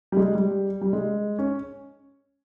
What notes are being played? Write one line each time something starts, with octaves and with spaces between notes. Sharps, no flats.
G3
G#3
G3
G3
G#3
C#4